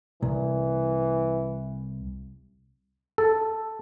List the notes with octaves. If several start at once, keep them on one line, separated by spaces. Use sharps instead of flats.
C2 E3
A4